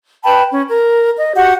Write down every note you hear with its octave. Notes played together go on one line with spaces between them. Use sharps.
B4 G5 A5 B5
C#4
A#4
D#5
F#4 G4 F#5